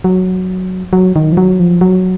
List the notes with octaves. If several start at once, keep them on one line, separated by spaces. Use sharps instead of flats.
F#3
F#3
D#3
F3
F#3
F3
F#3